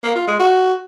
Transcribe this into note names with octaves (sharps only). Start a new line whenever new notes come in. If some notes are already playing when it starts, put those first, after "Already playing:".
A#3
F4
G#3
F#4